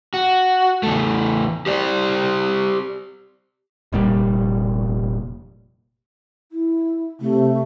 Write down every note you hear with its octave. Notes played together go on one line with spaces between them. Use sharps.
F#4
E2 A3
G4 C5 D5
F1 A#2 G3
E4
C3 A3